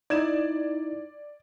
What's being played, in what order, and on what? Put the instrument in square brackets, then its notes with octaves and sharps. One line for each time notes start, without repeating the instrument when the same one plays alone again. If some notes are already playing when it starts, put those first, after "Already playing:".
[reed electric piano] D#4 E4 [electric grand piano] D5 G#6 E7